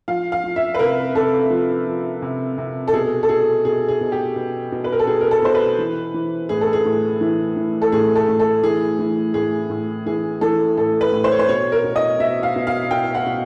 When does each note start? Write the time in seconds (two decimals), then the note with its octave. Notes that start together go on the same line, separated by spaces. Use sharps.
0.08 F3 F5
0.32 F5
0.44 F3
0.56 E5
0.74 B4
0.79 C3 A#4
1.15 C3 A4
1.50 F3
1.86 F3
2.22 C3
2.58 C3
2.88 A4
2.93 B2 G#4
3.23 A4
3.29 B2 G#4
3.65 B2 G#4
3.88 G#4
4.01 B2
4.12 G4
4.36 B2
4.72 B2
4.84 B4
4.92 A#4
4.99 A4
5.07 B2 G#4
5.21 A#4
5.31 A4
5.42 B2 C5
5.55 B4
5.78 E3
6.14 E3
6.49 A2 G#4
6.61 A4
6.73 G#4
6.85 A2
7.21 E3
7.57 E3
7.82 A4
7.92 A2 G#4
8.16 A4
8.28 A2
8.40 A4
8.63 E3 G#4
8.99 E3
9.34 A2 G#4
9.70 A2
10.06 E3 G#4
10.41 E3 A4
10.77 A2 A4
11.01 B4
11.12 A2
11.24 C5
11.31 C#5
11.39 C5
11.48 B2 C#5
11.72 A#4
11.84 B2
11.96 D#5
12.19 B2 E5
12.43 F5
12.56 B2
12.67 F5
12.91 B2 G5
13.15 F#5
13.26 B2